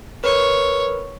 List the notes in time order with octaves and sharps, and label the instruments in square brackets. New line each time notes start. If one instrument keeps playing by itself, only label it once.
[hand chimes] A#4 B4 [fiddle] C#5